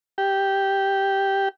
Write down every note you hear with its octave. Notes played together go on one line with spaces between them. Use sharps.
G4